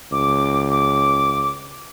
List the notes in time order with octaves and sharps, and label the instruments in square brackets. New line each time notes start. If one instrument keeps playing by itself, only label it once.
[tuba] C#2 [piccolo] D6
[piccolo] D6